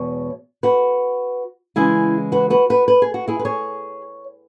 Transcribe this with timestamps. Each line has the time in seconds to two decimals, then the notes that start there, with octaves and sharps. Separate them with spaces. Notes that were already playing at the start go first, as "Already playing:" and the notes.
Already playing: E2 B2 G#3 C#5
0.63 F#4 B4
1.76 C#3 E3 G#3 C#4 E4 G#4
2.32 F#4 B4
2.50 F#4 B4
2.70 F#4 B4
2.88 B4
3.02 G#4
3.14 F#4
3.28 E4 G#4
3.39 B4
3.45 G#4 C#5